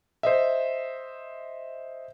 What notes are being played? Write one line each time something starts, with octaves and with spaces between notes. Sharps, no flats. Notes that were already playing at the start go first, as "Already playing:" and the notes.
C5 D#5 E5